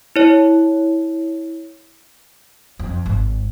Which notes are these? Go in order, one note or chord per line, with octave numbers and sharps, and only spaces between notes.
E4 C#5
F2
G#1